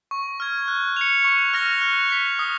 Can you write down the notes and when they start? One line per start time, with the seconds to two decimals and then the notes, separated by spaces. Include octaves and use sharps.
0.11 C#6
0.40 F6 G#6
0.68 F#6
0.96 C#7 F7
1.24 C#6
1.53 F6 A#6 F7
1.82 F#6
2.10 B6 F7
2.39 D#6